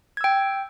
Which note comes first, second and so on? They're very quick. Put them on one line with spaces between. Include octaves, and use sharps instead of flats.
G#6 E6 G5